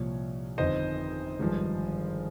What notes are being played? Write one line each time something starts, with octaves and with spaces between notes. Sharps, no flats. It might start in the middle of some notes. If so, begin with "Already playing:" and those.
Already playing: C2 A#2 F3 C#5
G1 F2 D#3 C5 D#5
G#1 G2 F3